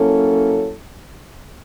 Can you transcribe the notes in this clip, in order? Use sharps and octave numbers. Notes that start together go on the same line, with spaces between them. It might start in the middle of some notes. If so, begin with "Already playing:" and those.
Already playing: F#3 A#3 C#4 E4 A4